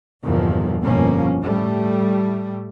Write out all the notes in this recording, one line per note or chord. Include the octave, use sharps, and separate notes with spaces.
G1 E2 A#2 D#3 F3
G1 F2 B2 F3 A#3 C#4
A2 G3 A3